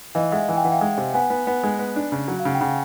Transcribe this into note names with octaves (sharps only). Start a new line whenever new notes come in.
E3 D#5 F5
G#3 E5 F#5
E3 G#5
G5
E3 F#5
F5 G5
G#3
C3
B3 F#5 G#5
B3
B3
G#3
B3
D4
C#3
F#3
F5
C#3 F#5
G5
C#3 F#5 G#5